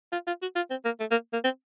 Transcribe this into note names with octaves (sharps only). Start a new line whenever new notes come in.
F4
F4
F#4
F4
C4
A#3
A3
A#3
A#3
C4